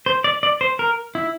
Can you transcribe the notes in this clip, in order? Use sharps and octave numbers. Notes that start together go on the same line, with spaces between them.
C5
D5
D5
C5
A#4
E4